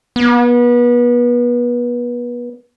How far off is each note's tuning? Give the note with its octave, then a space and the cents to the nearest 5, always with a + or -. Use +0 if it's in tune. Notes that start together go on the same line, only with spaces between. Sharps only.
B3 -30